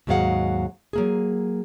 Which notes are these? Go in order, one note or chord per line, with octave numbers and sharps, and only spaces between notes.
D#2 G#2 F#3 G#3 F5 F#5
F#3 A#3 G#4